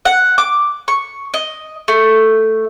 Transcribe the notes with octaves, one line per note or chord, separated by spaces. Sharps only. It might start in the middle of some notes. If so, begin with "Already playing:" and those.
F#5
D6
C#6
D#5
A3